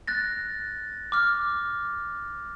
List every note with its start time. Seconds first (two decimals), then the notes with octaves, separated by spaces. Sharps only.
0.07 F#6 A6 A#6
1.12 D6 F6